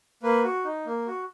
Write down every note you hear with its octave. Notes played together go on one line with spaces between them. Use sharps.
A#3 B4
F#4
D#4
A#3
F#4